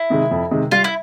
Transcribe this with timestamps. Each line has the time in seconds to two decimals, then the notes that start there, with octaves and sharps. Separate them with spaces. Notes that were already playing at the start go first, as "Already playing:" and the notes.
Already playing: E4
0.10 C3 D#3 G#3
0.31 F2
0.51 C3 D#3 G#3
0.71 G3 F4
0.84 E4